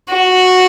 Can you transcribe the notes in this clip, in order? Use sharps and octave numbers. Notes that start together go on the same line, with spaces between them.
F#4